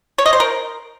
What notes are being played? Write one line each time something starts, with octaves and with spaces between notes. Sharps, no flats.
C#5
D#5
C5
A#4